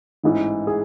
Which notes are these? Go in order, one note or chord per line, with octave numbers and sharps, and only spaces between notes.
A1 G#2 E3
G#4